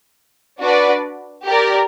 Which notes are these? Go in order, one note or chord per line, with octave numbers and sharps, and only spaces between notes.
D4 F#4 B4 D5
G4 A#4 D5